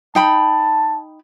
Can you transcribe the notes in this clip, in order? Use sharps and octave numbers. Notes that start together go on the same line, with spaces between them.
D#4 G5 A5 B5